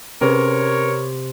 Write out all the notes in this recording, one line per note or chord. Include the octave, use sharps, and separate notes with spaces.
C3 C#4 G#4 A#4 B4 C#5